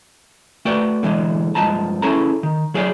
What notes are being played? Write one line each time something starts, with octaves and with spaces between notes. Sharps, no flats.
A3 F#4 B4 D5 F#5 G5
D3 E3 F#3 G#3
G2 F3 G#3 A5 A#5
C#4 E4 G#4 A4 A#5
D#3
F#3 G#4 C#5 D5